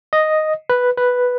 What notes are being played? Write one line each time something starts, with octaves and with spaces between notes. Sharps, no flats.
D#5
B4
B4